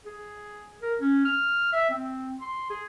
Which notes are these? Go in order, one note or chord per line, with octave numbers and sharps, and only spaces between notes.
G#4
A#4
C#4
F6
E5
C4
C6
G#4